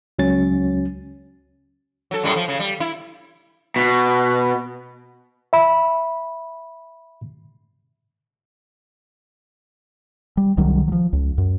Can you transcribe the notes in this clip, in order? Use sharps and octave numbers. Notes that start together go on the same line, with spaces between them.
C#2 F#3 C#4 A6
F#3 A4
F#2 A2 G3
F3
C#3
G3
E4
B2
E5 B5
G3
C2 D#3 F#3 G3
F3 F#3
C#2
F#2